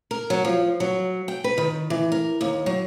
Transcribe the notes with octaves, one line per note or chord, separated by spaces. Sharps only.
A#4
F#3
F3
F#3
G5
B4
D#3
E3
A#4
D#2
F#3